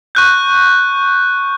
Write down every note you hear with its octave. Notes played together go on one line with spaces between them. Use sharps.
C#6 F#6 G6